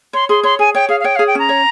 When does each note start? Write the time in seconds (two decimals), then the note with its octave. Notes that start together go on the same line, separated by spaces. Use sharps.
0.13 C#5 C6
0.29 G#4 C6
0.43 C#5 C6
0.59 G#4 G#5
0.75 C#5 G5
0.89 G#4 F5
1.00 F5
1.04 C#5 G5
1.15 F5
1.19 G#4
1.27 G5
1.35 C#4 A#5
1.49 C#5